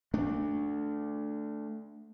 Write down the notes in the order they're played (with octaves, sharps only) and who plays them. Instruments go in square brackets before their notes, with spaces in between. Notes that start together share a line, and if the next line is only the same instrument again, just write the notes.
[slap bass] A3 D4